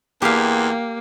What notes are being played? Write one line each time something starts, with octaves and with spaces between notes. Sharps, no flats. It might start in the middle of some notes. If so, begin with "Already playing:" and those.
E2 A#3 G4 F5